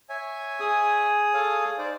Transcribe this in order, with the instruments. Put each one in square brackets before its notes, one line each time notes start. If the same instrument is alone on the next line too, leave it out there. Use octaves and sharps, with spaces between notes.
[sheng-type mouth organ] C#5 E5 G#5
[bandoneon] G#4 D#6
[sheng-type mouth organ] A4 C#5 F5
D#4 C5 D5